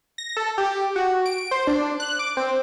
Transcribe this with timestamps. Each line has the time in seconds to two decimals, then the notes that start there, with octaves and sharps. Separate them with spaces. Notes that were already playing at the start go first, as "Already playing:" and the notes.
0.18 A#6
0.37 A4
0.58 G4
0.96 F#4
1.26 D7
1.51 C5
1.67 D4
2.00 F#6
2.19 D6
2.37 C4